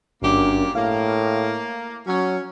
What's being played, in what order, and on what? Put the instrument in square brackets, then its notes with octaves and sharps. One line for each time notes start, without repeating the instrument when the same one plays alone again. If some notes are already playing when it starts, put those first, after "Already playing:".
[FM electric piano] G1 D4 D6 [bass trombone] F#2 [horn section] A#2 A#3 G4
[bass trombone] A2 [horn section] A#3 [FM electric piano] F5 F6
[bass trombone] F#3 [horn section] C#4